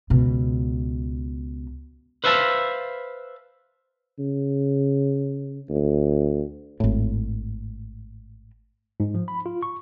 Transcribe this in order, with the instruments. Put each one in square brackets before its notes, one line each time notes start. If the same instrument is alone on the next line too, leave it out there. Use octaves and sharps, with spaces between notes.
[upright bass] C#2 B2
[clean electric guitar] B4 C5 E5 F5 G#5 A5
[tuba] C#3
D2
[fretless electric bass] G#1 A2
[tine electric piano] G#2
F3
B5
F4
C#6